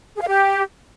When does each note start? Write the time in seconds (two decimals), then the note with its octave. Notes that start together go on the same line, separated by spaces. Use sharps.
0.15 G#4
0.21 F5
0.27 G4